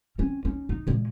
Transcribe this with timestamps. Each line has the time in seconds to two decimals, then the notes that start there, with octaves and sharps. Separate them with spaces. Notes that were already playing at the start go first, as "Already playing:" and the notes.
0.18 C4 C#4
0.45 C#4 D#4
0.69 D#4
0.87 A#2 G#3